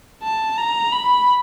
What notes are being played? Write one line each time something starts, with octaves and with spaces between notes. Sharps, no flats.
A5
A#5
B5